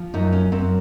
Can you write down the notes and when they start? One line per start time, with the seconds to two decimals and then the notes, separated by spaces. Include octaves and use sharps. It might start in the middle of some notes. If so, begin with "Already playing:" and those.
Already playing: F3
0.14 F#2 D#4
0.33 C#4
0.52 F#2 C4